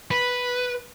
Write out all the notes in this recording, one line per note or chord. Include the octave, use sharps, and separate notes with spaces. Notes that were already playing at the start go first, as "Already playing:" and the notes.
B4